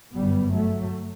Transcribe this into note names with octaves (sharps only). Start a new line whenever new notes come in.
G1 F#2 G3 B3
F#3 A3